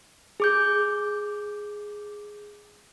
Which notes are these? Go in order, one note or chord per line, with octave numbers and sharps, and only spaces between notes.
G#4 D6 G6